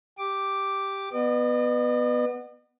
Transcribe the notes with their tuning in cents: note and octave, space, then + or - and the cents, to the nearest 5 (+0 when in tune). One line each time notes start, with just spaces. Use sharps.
G4 +0 D6 +0
B3 +0 D#5 -45